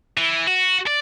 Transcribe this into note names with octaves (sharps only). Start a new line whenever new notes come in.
E3
F#4
D5